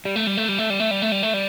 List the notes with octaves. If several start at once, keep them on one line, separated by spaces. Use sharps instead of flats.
G3
A3
G3
A3
G3
A3
G3
A3
G3
A3
G3
A3
G3